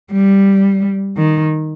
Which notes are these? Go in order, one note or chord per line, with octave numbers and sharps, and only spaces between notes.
G3
D#3